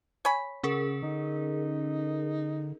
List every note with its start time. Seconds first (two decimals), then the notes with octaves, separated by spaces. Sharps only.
0.25 C#5 G#5 B5
0.63 C#3 C#4 G#4 A#4
1.03 D3 D#4